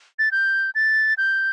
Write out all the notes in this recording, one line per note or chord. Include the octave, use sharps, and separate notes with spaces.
A6
G6
A6
G6